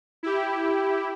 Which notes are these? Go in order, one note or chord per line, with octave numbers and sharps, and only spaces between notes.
E4 G4